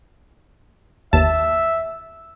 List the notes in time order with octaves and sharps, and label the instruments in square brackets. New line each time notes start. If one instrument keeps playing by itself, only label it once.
[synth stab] G1 D#2 A5 [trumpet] E5